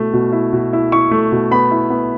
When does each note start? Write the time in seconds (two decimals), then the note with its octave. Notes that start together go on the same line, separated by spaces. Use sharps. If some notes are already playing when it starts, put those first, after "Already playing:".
Already playing: B2 A3 E4
0.13 B2
0.32 E4
0.53 B2
0.73 E4
0.92 E4 C#6
1.11 A3
1.32 B2
1.51 B3 B5
1.71 E4
1.90 B3